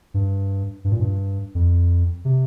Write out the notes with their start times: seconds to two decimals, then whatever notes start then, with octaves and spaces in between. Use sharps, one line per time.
0.14 G2
0.84 G2
0.92 A#2
1.00 G2
1.55 F2
2.25 C3